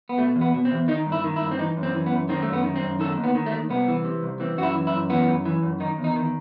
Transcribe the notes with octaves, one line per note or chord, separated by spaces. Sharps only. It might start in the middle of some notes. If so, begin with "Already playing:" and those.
B3
B2 A3
E2
B3
B2
C4
E2
D#3 D#4
G2
E4
D#3
E4
G2
C4
E3 D#4
F#2
C4
E3
B3
F#2
D#3 C4
A3
F#2
B3
D#3
C4
F#2
D#3 A4
D#2
B3
D#3
A3
D#2
C2 B3
E3
C3
C2
E3 C4
F#2 F#4
E4
E3
E4
F#2
E3 B3
F#2
E3
F#2
D#3 D#4
E2
D#4
D#3